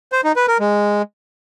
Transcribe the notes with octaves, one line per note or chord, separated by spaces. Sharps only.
C5
D#4
B4
A#4
G#3